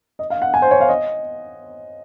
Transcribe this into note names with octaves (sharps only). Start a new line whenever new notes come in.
D#5
F5
F#5
G#5
C5
C#5
F5
D#5